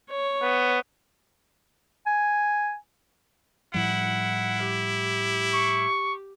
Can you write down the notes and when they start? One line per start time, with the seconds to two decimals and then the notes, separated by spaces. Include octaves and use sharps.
0.10 C#5
0.42 B3
2.06 G#5
3.74 A2 F3 G3 E4 F#5
4.64 G4
5.53 C#6